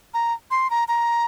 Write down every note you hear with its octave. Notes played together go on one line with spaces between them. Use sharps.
A#5
C6
A#5
A#5